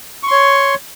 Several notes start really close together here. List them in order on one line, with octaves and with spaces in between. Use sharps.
C#6 C6 C#5